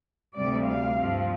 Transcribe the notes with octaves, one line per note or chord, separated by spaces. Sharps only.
D2 C3 G3 D5
F5
G2 F3 C4